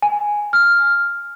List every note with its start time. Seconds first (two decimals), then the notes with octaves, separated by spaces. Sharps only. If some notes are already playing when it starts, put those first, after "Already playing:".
0.02 G#5
0.53 F6